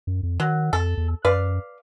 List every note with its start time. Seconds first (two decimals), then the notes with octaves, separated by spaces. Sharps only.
0.07 F#2
0.23 F2
0.40 D#3 F#3
0.73 F2 A4
0.97 E2
1.25 F#2 B4 D5 F5